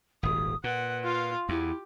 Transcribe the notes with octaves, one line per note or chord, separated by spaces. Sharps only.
D#1 G#1 D#6
A#2 B4 F#5
F4 F5
E2 E4 G4